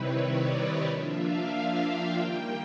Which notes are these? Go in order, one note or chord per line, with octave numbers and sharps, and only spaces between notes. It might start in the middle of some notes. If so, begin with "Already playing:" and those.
Already playing: C3 D#3 G3 C4 E4 B4 C#5
D5
D#5
F3 A#3 D4 F4 E5
F5
G5
D#3 G3 A#3